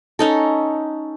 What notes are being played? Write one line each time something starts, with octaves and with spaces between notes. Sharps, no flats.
C#4 D#4 A4